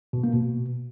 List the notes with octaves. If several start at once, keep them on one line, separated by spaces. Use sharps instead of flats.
B2
A#3
B2